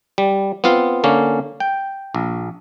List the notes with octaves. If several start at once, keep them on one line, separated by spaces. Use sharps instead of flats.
G3
B3 C4 F4 F5
D3 A#3 C#4
G5
A#1